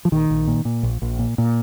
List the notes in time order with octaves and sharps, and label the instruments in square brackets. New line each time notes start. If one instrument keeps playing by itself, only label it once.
[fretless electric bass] F3
A#1 D#3
A#1
A#2
A#2
A#1
A#1
A#2
A#2